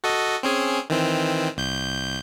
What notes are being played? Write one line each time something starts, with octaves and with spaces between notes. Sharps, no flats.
F#4 A4 D#5
C4 C#4 G#4
D#3 E3 C4
C2 G6